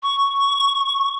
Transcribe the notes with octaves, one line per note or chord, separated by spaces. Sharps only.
C#6